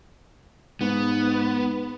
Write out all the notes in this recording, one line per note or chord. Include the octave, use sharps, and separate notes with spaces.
G#2 B3